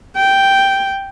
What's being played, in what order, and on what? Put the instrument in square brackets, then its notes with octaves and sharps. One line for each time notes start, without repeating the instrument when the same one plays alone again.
[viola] G5